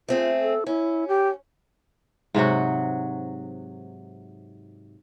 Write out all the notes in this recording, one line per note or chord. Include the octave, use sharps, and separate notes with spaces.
A3 C4 F4 G#4
A4
C#4 E4
G4
G#2 C3 F#3 F#4